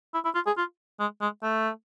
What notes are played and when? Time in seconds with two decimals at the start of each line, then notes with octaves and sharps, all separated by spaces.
0.14 E4
0.24 E4
0.35 F4
0.47 G#4
0.57 F4
1.00 G#3
1.21 G#3
1.43 A3